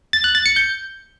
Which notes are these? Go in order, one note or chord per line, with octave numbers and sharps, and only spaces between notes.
A6
F#6
A6
C#7
G6